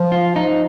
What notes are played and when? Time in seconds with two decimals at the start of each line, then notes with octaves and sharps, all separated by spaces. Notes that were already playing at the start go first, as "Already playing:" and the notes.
Already playing: F3
0.12 F4
0.36 D#4